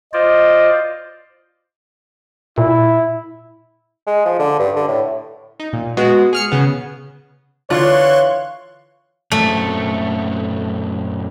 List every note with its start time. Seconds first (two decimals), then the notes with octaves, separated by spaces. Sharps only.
0.14 F4 C5 D5 D#5
2.58 A#2 E4
4.07 G#3
4.25 F3
4.39 D3
4.59 G2
4.76 D3
4.88 A2
5.60 D#4
5.73 A#2
5.97 G#3 B3 F#4
6.33 G#4 F6 C#7
6.52 C#3 B3
7.70 D3 E3 F4 C#5 D5 C6 C#6 F#6
9.32 F#2 A#2 A3 C4